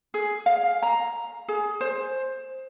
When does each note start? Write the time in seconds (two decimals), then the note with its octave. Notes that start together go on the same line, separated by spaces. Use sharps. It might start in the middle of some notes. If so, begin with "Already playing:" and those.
0.14 G#4
0.46 F5
0.83 A#5
1.48 G#4
1.81 C5